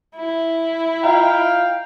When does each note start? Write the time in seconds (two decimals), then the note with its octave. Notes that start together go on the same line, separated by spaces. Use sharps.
0.17 E4
1.04 F4 D#5 F5 G5 A#5